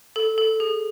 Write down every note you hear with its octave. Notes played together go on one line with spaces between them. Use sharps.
A4
A4
G#4